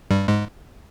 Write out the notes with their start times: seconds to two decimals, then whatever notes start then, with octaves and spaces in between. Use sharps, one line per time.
0.11 G2 G3
0.28 G#2 G#3